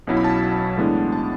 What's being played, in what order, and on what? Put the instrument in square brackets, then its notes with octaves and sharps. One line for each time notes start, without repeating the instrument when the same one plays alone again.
[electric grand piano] B1 B2 F#3 C#4 E4
B5
A5
A2 E3 G#3 B3 D4
A5